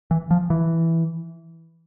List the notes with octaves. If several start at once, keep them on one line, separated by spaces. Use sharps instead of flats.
E3
F3
E3